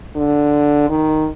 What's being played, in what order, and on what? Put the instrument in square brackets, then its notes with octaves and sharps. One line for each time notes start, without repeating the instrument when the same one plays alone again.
[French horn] D3
D#3